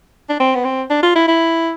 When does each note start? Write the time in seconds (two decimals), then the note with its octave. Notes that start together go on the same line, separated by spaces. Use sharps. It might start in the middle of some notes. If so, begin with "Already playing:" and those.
0.29 D4
0.40 C4
0.55 B3
0.65 C4
0.90 D4
1.03 F4
1.16 E4
1.28 E4